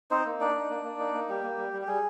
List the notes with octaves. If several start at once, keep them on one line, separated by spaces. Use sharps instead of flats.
C4 D#4 C5
A#3
D4 D#4 D5
D#4
A#3
A#3
D#4
A#3
G3 G4
A#3
G3
G3
G4
G3 G#4